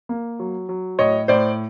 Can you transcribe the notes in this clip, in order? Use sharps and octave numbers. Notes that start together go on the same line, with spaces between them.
A#3
F#3
F#3
A2 C#5 D#5
A2 C5 D5